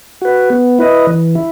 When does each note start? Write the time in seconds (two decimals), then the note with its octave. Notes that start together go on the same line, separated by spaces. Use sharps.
0.21 F#4 B4
0.50 B3
0.79 E4 B4 D#5
1.07 E3
1.35 E4